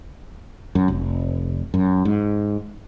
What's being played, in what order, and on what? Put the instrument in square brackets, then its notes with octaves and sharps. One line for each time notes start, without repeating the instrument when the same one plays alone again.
[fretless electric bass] F#2
F1
F#2
G#2